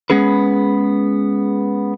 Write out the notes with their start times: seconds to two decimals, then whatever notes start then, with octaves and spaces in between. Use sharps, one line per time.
0.10 G#3 B3 C#4 G#4 B4